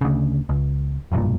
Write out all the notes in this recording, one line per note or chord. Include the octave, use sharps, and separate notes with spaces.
D2 C#3
C#2
F1 B1 G2 A#2